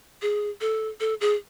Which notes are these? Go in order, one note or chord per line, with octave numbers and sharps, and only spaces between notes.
G#4
A4
A4
G#4